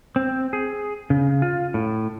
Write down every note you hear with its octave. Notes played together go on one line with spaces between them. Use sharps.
C4
G#4
C#3
F4
A2